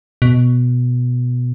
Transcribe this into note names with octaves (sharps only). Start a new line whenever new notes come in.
B2